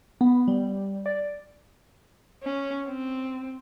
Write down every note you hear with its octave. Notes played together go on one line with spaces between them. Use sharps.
B3
G3
D5
C#4
C4